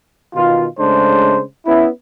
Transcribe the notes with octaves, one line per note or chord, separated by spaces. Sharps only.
B2 D#3 F4
C#3 G#3 A3 D4 C5
B3 C#4 E4